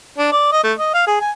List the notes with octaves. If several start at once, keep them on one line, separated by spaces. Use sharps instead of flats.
D4
D5
D#5
A3
D#5
F5
G#4
G#5